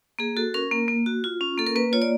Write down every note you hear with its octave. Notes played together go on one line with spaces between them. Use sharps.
A#3 G#4
F#4 A4
C#4 A#4
A#3
A#3
F#4
F4
C#4
A#3 A4
A#4
A#3 B4
F4 C#5
D5